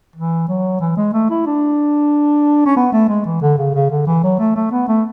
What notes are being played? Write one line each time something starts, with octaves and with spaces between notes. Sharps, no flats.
E3
F#3
E3
G#3
A3
E4
D4
C#4
B3
A3
G#3
E3
D3
C#3
C#3
D3
E3
F#3
A3
A3
B3
A3